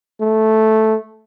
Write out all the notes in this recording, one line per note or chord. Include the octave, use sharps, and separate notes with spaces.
A3